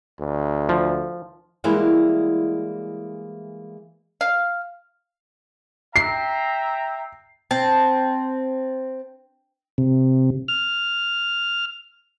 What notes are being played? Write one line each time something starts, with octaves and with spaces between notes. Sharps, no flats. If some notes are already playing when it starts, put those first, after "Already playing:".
D2
F3
E3 G3 G#3 A#3 E4 F#4
F5
E5 G5 A#5 C7
C4 A5
C3
F6